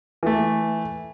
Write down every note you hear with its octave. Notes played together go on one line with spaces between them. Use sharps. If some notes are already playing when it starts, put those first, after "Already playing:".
E3 A3